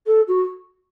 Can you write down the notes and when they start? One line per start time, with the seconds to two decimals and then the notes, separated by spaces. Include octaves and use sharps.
0.06 A4
0.27 F#4